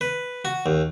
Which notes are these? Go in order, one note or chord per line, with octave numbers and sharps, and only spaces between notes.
B4
F#4
D#2